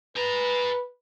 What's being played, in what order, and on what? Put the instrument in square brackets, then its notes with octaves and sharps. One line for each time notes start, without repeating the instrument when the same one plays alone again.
[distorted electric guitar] G#4 A#5 [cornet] B4